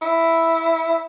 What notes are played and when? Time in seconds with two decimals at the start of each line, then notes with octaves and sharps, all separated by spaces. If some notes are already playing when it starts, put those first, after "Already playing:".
0.02 E4